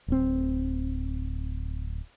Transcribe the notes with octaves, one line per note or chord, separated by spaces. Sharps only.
D1 C4